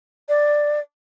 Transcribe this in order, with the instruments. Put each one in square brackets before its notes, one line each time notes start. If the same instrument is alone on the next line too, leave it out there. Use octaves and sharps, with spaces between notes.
[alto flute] D5